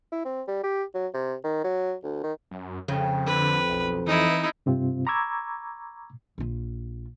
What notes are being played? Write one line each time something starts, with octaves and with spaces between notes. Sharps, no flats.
E4
C4
G3
G4
F#3
C3
D#3
F#3
D2
D#3
F#2
F2 C#3
D3 B4
B1
E3 D#4 E4
G2 C3 C4 F4
A#5 B5 C#6 D6 E6 G#6
A#1 F4